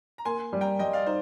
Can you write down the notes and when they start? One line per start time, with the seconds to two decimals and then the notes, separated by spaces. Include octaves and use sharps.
0.18 A#5
0.25 A#3 G#5 C6
0.53 G3
0.61 G5 A#5
0.79 G3 D#5 G5
0.93 D5 F5
1.06 D#4 C5